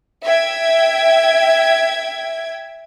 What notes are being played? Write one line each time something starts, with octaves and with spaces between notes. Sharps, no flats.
E5 G5 G#6